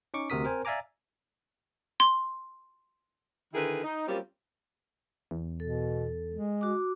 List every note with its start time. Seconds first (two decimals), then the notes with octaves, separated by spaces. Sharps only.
0.14 C#4 D#4 C#6 D6
0.30 D2 C3 F#4 A#4 D#6 B6
0.44 C4 A#4 C5 G#5
0.65 D5 E5 F5 G#5 A#5 D6
2.00 C6
3.54 D3 D#3 E4 G#4 A#4 B4
3.84 D#4
4.08 F#3 G3 A#3 C4 C#4 F4
5.31 E2
5.60 B2 A4
6.34 G#3
6.61 F#4 D6